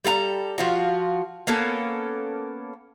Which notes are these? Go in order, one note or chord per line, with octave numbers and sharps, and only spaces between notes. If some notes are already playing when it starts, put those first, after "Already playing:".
G3 A4 F5 A#5
F3 F4 F#4
A#3 B3 C#4 A4